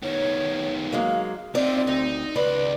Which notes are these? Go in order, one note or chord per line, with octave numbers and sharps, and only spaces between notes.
D#3 B3 C#5
F#3 G#3 A#3 F5
C4 D#4 F4 D5
D2 D#4
C#2 B4 D5 B5